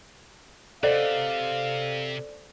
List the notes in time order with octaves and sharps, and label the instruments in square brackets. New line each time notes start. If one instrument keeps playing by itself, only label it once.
[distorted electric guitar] C3 [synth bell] A4 C5 [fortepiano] D5 [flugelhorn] F5